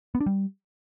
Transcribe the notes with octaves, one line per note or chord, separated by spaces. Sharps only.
B3
D4
G3